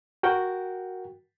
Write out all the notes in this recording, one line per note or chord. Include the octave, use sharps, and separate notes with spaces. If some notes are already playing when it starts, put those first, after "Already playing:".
F#4 A#4 F#5 G5